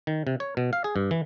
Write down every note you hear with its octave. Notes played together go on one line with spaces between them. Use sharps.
D#3
C3
C#5
B2
F5
G#4
G2
E3